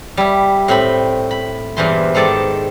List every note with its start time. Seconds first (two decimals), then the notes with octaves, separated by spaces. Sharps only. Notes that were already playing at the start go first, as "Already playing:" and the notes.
0.17 G3 E4
0.68 A2 C4 B5
1.31 B5
1.77 E2 G2 A#2 E3 C5 C6
2.15 G#2 D#3 A4 D5 A5